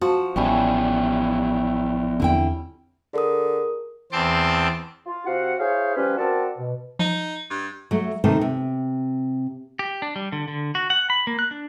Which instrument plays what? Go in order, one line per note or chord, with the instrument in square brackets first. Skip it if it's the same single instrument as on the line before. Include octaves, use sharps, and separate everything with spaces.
[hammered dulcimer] F3 [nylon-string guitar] F#4
[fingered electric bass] A1 [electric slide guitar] F3 B3 E5 [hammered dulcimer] G3 C#4 E4
[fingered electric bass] E2 C4 [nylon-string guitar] D3 E4 G5
[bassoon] D3 [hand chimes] G#4 A#4 D#6
[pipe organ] E2 C4 A5 C6 D6
[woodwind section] F4
C3 F#4 F5 F#5
E4 G#4 C5 C#5 F5
F3 G3 C#4 B4
C4 F#4 A#4 D5 A5
B2
[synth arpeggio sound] F3 [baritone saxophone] D#4
[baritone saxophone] G2
[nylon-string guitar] F#3 A3
C3 D#3 A3
C3
[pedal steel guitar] G4
D4
G3
D3
D3
F#4
F#5
B5
A#3
F#6
D4